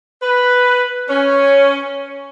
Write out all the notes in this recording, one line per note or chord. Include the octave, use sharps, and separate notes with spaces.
B4
C#4